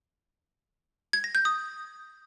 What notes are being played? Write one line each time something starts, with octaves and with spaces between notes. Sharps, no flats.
G#6
A#6
G6
D#6